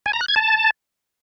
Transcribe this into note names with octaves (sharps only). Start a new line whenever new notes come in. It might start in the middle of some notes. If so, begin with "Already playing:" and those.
G#5
A#5
F#6
G#6
A5